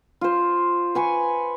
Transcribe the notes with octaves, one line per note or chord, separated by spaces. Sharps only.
F4 C5
B4 G#5 C#6